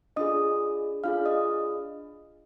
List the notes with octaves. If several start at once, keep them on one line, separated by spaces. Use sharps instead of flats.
D4 F4 G#4 D#5 D#6
D4 F4 G#4 F5 F6
D#5 D#6